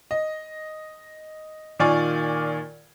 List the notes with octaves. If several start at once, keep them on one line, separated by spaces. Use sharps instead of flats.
D#5
A#2 D#3 F4 D5 G#5 C#6